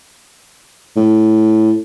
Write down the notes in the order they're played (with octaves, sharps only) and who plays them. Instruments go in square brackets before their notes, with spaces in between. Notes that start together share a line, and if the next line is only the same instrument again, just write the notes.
[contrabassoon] A2